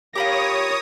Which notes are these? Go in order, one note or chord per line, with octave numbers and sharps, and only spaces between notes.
F4 G4 A#4 C#5 B5 D6 D#6 A#6